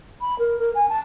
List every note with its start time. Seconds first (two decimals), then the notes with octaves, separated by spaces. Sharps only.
0.21 B5
0.39 A#4
0.59 A#4
0.75 G#5
0.89 A5